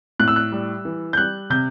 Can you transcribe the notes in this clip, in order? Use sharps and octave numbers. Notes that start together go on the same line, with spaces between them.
A2 F#6
E6
F#6
G3
E3
G6
G3 F#6
C3 G6